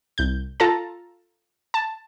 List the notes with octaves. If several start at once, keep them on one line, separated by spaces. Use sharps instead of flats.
C2 G6
F4 A4 A5 A#5
A5